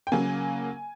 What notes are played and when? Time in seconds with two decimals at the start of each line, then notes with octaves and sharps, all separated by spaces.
0.07 G5
0.12 C#3 F#3 A#3 G#5